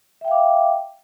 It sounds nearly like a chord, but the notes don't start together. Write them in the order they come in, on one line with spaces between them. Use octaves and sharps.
E5 G5 F5 D6